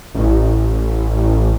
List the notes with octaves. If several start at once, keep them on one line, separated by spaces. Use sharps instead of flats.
A1